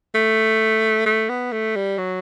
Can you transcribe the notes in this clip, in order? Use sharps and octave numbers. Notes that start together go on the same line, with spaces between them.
A3
A3
B3
A3
G3
F#3